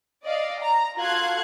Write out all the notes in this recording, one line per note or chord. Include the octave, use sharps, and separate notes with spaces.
D5 D#5 F5
A#5
F4 F#4 A4 F5 F#6 G#6